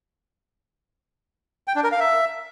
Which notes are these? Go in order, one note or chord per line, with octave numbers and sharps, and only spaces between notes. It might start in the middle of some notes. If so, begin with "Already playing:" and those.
G5
D4
A#4
F5
E5